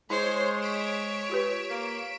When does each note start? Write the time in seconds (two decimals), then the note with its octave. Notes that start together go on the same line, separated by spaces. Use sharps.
0.10 G#3 E4 C5 C#5 C6
0.61 C#5 B6 D7 E7
1.29 F4 G4 B4
1.69 A#3